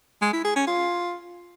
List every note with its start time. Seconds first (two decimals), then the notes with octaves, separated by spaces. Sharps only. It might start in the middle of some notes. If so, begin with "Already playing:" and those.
0.22 G#3
0.33 E4
0.45 G#4
0.56 C#4
0.67 F4